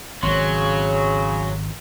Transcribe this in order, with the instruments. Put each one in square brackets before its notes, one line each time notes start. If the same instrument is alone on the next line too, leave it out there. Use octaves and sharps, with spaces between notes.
[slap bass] G#1 [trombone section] C#3 [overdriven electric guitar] F#3 [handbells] C6